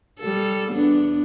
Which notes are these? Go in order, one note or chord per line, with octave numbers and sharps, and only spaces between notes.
G3 A4
E2 B3 D4